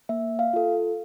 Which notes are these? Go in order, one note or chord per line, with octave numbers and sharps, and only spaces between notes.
A#3 E5
F5
F4 A4